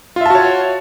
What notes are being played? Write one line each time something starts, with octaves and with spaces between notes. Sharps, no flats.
F4 F#4 C#5 E5 A5